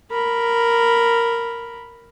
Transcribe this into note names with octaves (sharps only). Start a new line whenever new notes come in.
A#4 B5